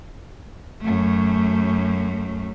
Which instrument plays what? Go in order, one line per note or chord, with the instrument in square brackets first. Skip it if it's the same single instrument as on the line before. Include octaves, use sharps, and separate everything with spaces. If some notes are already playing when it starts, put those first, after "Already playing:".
[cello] F#2 A3